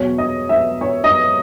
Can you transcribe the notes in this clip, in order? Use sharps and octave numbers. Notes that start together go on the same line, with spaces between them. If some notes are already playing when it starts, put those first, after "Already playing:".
Already playing: E2 B2 F#3 C#5
D#5
E5
C#5
D#5